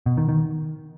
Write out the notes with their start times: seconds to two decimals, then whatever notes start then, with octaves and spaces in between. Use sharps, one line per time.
0.06 B2
0.17 D#3
0.29 D#3